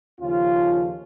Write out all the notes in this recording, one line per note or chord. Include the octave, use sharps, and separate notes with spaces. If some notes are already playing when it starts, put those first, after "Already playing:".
D#2 C#3 F3 C#4 F4